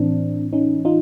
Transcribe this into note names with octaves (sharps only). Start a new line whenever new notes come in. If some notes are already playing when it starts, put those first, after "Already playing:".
Already playing: A2 E3 C4 D4
C#4 D#4
D#4 F4